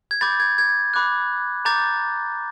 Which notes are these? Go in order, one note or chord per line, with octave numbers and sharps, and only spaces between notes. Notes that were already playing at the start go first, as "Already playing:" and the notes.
G#6
B5 D6 G6 A6
G#6
G#6
B5 D6 F#6
A#5 D6 G6 A6